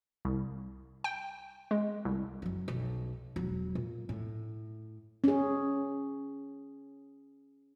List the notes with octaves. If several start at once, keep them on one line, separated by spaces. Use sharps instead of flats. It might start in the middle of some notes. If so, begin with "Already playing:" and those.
C2
G5
G#3
C2
F#1 F#3
B1
E1 F#3
A#2
A2
C#4 G#4